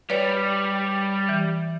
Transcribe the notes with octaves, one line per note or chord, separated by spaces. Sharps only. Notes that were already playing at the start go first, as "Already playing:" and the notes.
G3 B4 C#5 D5
E3